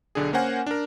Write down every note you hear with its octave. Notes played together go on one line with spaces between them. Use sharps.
B1 D3 D4 G#4
A#3 C#4 A#4 C5 F#5 G#5
D4 A#4